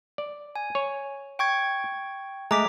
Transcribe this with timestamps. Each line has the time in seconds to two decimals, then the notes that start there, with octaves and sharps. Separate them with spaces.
0.18 D5
0.56 G#5
0.75 C#5
1.39 G5 C#6 G#6
2.51 G#3 A3 A#5 D6 B6